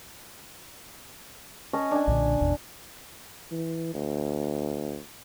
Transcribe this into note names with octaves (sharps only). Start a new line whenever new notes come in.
C#4 D#5 A5
D4 G#5
B1 A#2 D3
G#1 E2 B2
E3
D2